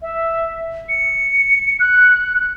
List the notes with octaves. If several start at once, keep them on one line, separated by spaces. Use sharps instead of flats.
E5
C#7
F#6